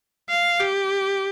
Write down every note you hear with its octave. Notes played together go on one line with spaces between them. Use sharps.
F5
G4